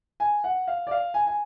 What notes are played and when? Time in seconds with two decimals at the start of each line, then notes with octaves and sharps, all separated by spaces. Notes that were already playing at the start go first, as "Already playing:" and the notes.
0.20 G#5
0.44 F#5
0.67 F5
0.87 D5
0.91 F5
1.14 G#5
1.27 G#5